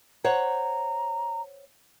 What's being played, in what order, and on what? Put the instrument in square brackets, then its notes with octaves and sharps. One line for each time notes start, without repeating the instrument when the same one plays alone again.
[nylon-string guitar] C5 C#5 F#5 [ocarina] A#5